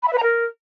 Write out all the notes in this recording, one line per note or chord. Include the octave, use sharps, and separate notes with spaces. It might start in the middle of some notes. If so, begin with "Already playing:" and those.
B5
E5
B4
A#5
A#4